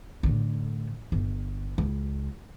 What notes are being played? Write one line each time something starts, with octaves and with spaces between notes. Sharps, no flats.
A2 D3
G1
C#2